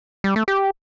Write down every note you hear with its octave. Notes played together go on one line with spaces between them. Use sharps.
G3
A3
G4